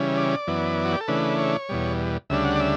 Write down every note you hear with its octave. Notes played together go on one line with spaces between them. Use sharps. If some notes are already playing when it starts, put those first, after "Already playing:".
Already playing: C#3 E3 G3 C#4
D5
F#2 E3 B3
F#4
G4
A4
C#3 E3 A3 D4 B4
C#5
E2 B2 G3
D2 C#3 G3 D4 E5
F#5
D5
E5